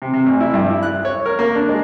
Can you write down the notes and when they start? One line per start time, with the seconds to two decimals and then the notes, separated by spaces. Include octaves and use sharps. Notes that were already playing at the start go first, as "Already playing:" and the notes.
0.02 C3
0.13 C3
0.26 A1
0.40 E4
0.54 G2
0.70 E4
0.83 F#6
1.05 C#5
1.26 A#4
1.39 A#3
1.55 D4
1.69 G#3